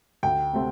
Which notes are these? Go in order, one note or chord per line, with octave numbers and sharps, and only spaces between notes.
D2 G5
C3 A3 C4